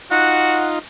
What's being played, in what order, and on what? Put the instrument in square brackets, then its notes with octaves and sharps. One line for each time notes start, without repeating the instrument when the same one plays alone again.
[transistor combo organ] D#4 F4 [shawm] F#4 [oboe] F#5